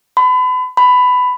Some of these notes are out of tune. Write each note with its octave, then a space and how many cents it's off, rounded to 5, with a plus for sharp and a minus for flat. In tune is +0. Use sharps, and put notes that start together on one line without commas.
B5 +35
B5 +15